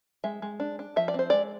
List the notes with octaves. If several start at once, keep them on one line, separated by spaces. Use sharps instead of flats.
G#3 E5
G#3
D4
D4
F3 E5
D5
C4 C5
G#3 D5